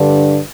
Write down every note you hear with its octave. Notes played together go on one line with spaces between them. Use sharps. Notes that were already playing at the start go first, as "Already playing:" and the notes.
Already playing: G2 D3